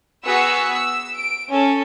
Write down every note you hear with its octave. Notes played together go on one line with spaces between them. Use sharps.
B3 F#4 G#4 E6 B6 C#7
E6
D7
C#4 A4